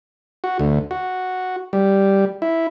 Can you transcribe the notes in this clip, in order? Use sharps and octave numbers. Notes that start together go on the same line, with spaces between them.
F#4
D2
F#4
G3
E4